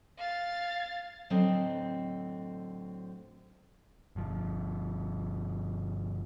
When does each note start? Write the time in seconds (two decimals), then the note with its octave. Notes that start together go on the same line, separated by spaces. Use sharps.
0.18 F5 A6
1.30 A2 D3 F#3 C4 A4 D#5
4.16 G1 F3